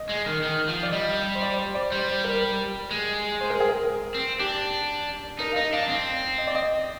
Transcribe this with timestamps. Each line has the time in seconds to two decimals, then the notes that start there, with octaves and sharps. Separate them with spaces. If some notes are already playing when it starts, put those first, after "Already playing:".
Already playing: D#5
0.09 G#3
0.26 D#3
0.43 D#3
0.68 F3
0.83 D5
0.92 G3 D#5
1.35 C5
1.42 D5
1.59 C5
1.75 D5
1.91 G3 C5
2.24 A#4
2.91 G#3
3.41 C5
3.50 A#4
3.60 G#4
3.69 A#4
4.15 C4
4.39 D4 G4
5.39 D#4 A#4
5.52 F5
5.56 D#4 D#5
5.73 D4 F5
5.89 C4
6.38 D#5
6.47 D5
6.55 D#5